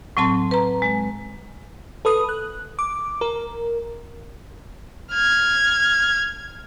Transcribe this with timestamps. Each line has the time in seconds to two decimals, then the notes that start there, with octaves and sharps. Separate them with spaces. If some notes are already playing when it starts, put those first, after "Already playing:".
0.17 A2 F#3 C4 A5 C6
0.51 B4 A#5
0.82 G#3
2.05 A4 B4 D#6
2.29 F#6
2.79 D6
3.21 A#4
5.12 F6 G#6